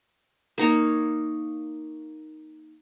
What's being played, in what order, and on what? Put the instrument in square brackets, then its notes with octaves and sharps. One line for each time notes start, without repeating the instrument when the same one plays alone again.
[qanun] A#3 D#4 C#5